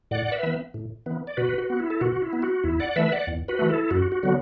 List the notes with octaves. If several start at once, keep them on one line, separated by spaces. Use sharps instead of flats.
A2 D5 F#5
B4 E5
E3 B3
A2
E3 B3
D5
B2 F#4 B4
F#4
B3
E4
A4
B2 F#4
E4
B3
F#4
E2 E4
D5 F#5
E3 A3 B4 E5
D5 F#5
E2
F#4 B4
E3 A3
E4 A4
F#2 F#4
F#4
D3 F#3 B3 F#4